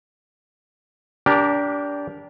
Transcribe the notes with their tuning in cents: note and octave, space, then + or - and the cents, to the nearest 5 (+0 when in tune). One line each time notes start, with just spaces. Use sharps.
D4 -20 G4 +0 A#4 +5